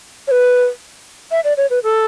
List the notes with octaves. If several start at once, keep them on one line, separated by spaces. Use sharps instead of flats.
C#5
B4
E5
D5
C#5
B4
A4